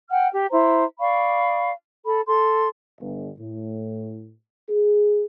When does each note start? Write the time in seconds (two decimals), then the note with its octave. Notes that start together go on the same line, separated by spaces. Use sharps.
0.10 F#5 G5 F6
0.32 G4
0.50 E4 C5 A#5
0.99 D5 F5 B5 C#6
2.05 A4 B5
2.27 A4 C6
3.00 G1
3.39 A2
4.69 G#4